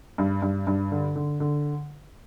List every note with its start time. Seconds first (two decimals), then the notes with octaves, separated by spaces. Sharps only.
0.18 G2
0.42 G2
0.67 G2
0.92 D3
1.16 D3
1.40 D3